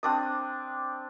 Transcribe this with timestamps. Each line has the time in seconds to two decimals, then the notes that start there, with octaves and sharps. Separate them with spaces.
0.03 C4 D4 D#6